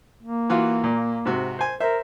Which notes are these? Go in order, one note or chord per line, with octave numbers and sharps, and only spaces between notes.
A#3
E3 F4 F#4
A#2
G#2 C3 F#4
C5 G#5
A#4 C5 E5